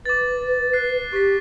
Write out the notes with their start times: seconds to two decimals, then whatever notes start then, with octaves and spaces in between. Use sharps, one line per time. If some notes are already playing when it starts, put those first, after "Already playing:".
0.06 B4 D6 A6
0.73 F#6 C7
1.13 G4 C#6 B6